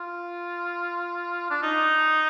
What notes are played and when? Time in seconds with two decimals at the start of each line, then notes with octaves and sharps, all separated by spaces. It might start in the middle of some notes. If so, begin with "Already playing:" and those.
Already playing: F4
1.50 D4
1.63 D#4